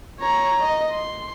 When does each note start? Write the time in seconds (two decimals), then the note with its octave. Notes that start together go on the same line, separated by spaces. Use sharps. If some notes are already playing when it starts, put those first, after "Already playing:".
0.20 C#5 A#5
0.62 D#5
0.91 C6